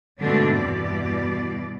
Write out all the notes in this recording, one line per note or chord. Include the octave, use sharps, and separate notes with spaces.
G#2 B2 D3 A3 C4 D4
E2 G2 B2 E3 D5